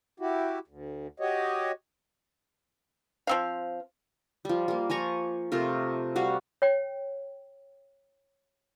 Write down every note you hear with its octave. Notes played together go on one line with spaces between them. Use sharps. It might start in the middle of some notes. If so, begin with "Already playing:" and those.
E4 F#4 G4
D2
F#4 G4 C#5 D#5
F3 C4 F5
F3 G3
G3 A#3
F3 G#5 A#5 C#6
C3 A3 F4 A#4
G3 F#4 F5
C#5 G5